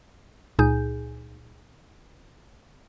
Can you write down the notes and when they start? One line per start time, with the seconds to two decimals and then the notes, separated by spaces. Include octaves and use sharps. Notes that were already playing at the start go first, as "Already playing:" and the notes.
0.59 C#2 A#2 D#4 G#4 G#5 G6